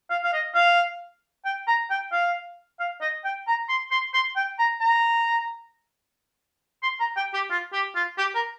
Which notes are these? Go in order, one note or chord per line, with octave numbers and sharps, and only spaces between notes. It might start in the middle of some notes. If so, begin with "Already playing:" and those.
F5
F5
D#5
F5
G5
A#5
G5
F5
F5
D#5
G5
A#5
C6
C6
C6
G5
A#5
A#5
C6
A#5
G5
G4
F4
G4
F4
G4
A#4